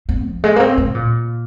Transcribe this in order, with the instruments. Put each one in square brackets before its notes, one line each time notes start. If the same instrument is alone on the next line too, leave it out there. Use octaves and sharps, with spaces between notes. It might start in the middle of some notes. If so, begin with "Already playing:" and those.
[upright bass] C4
F3
G#3
A#3
C4
G#3
C3
A#2